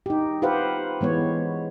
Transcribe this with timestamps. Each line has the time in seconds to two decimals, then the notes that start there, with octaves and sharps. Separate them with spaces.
0.06 D#4 G4
0.42 F4 G4 B4 C5 F5 F#5
1.01 E3 G#3 B3 C#5